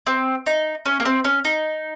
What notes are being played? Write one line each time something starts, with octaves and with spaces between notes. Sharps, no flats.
C4
D#4
C#4
A#3
C4
C#4
D#4